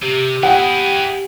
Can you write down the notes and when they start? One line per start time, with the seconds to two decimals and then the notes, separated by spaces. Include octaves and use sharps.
0.02 C3 G4
0.43 E4 G#4 F#5 G5